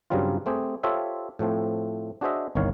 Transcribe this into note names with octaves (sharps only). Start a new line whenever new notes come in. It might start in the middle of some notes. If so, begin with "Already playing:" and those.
G2 C#3 F#3 G3 C4 F4
A3 C4 G4 G#4
F4 G4 A4 C5 C#5 E5
A2 F3 A3 C4
D4 F#4 G#4 C5 D#5 E5
G1 C2 D#3 C#5 F5